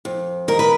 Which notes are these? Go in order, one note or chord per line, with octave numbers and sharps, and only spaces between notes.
F2
D#3 A#4
B4